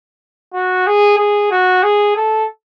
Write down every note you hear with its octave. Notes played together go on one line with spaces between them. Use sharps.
F#4
G#4
G#4
F#4
G#4
A4